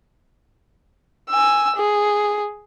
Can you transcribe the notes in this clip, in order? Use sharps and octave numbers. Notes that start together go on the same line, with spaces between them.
G#5 E6
G#4